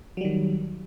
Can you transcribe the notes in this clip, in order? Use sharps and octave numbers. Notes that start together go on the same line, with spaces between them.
D#3 F#3 G3